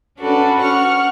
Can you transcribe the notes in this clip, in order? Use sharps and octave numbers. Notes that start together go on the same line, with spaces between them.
C#4 D4 F#4 A4 B4
F#5 C#6 F6